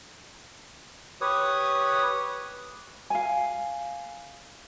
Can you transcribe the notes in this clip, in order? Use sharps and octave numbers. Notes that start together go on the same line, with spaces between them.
G4 B4 C#5 D#6
F5 G#5